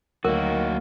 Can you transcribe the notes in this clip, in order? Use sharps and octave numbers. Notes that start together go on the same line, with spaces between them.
D2 D#3 F#3 A#3 F#4 A#4